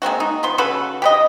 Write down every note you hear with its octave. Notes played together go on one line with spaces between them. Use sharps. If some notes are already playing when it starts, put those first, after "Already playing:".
G#3 A#3 C4 F#4
D#4
F3 B3 C6
C#3 F#4 A4 B4
G4 B4 D#5